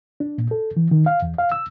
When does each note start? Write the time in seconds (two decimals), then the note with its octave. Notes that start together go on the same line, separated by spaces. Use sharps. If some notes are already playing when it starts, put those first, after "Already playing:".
0.20 D4
0.38 A#2
0.51 A4
0.77 E3
0.91 D#3
1.06 F5
1.22 E2
1.38 F5
1.52 E6